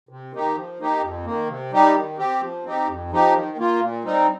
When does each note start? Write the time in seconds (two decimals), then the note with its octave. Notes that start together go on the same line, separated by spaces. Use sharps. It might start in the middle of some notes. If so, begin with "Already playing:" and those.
0.09 C3
0.33 D#3 A#3 D#4 G4
0.56 F3
0.79 A#3 D#4 G4
1.02 F2
1.25 D#3 A#3
1.48 C3
1.72 G3 D#4 G4
1.95 D#3
2.18 C4 G4
2.41 F3
2.64 C4 D#4 G4
2.88 F2
3.11 F3 D#4 G4
3.34 D#3
3.57 A#3 F4
3.80 A#2
4.04 G3 C4 D#4